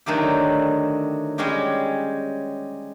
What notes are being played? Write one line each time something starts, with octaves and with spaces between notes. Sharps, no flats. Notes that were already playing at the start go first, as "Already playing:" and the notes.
D3 D#3 F#3 A3 G4
G3 G#3 C#4 F#4 G4